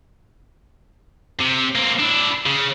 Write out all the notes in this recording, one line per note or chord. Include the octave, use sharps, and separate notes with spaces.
C3
A#3 C4
D4 E4
C#3